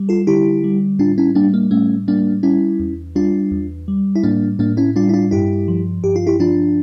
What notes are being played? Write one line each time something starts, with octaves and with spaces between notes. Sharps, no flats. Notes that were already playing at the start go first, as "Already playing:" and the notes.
Already playing: G3
F4 A4
D3 E4 G4
G3
A2 D4 F4
C#4 E4
G3 A#3 D4
A#3
A2 A3 C#4
G3 A#3 D4
G3 C#4 E4
E2
G3 D4 F4
E2
G3
E4
A2 A#3 D4
A2 A#3 D4
C#4 E4
G3 D4 F4
E4
D4 F4
G2 E4 G4
F3
G2 G4
F4
E4 G4
F3 D4 F4